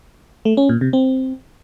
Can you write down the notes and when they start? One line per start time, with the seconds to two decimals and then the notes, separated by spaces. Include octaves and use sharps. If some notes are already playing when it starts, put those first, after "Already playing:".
0.45 A3
0.57 C#4
0.69 A#2
0.81 C3
0.93 C4